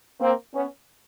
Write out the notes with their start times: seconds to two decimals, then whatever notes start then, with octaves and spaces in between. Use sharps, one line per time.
0.20 A#3 C4
0.54 B3 C#4